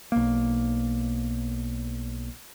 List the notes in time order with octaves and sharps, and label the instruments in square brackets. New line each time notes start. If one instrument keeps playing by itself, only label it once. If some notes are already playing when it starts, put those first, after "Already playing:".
[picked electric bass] B1 A#3